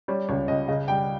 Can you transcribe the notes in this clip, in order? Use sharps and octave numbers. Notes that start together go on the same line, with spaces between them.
G3 C#5
C#2 C#5
C#2 D#5
C#3 D#5
G3 G5